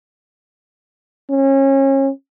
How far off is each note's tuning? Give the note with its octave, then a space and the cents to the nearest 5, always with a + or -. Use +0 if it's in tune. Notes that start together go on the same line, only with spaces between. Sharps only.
C#4 -30